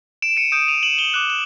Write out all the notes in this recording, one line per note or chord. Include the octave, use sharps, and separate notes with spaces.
D7 E7
C#7 D#7
D#6 G6 D7 E7
D#7 F7
E7 F#7
F7 G7
D6 F#6 E7 F#7
E7 F#7